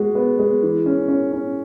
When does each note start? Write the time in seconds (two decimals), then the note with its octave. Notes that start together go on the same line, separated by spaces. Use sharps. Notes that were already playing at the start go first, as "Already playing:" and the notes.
Already playing: G#3 F#4
0.15 B3
0.39 G#3
0.63 E3
0.86 C#4
1.08 C#4
1.32 C#4